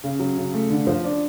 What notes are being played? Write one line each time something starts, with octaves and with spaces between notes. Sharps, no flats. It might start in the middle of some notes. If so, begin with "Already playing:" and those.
C#3
F#3
C#3
A3
D3
F3
D4